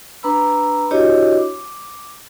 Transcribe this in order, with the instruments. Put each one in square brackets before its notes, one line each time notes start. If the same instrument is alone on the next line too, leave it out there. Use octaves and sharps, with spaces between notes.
[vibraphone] D4 B4 A#5 B5 E6
D4 E4 F#4 G4 C#5 D#5
D6